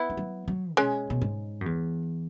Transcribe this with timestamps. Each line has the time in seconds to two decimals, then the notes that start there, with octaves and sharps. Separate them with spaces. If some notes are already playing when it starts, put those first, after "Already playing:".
Already playing: B3 E4
0.10 E3
0.17 F#3
0.48 F#3
0.77 B2 G#3 C#4
1.10 B2
1.22 G#2
1.61 F#2
1.66 E2